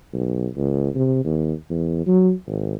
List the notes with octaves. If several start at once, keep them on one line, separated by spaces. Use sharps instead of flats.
B1
C#2
C3
D#2
E2
F#3
G#1